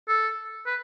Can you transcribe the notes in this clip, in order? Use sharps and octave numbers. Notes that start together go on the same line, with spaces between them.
A4
B4